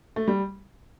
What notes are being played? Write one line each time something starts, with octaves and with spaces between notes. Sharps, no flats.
A3
G3